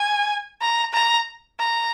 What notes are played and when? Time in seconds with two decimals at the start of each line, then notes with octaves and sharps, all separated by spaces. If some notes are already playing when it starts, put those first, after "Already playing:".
Already playing: G#5
0.61 A#5
0.93 A#5
1.59 A#5